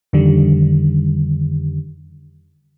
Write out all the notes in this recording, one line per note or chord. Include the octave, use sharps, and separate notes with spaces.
F2 D3 D#3 G3